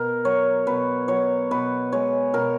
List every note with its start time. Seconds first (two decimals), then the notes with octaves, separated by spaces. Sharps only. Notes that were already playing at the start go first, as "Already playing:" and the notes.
Already playing: B2 A#4
0.25 F#3 C#5
0.67 B2 B4
1.08 F#3 C#5
1.51 B2 B4
1.92 G#3 C#5
2.34 B2 A#4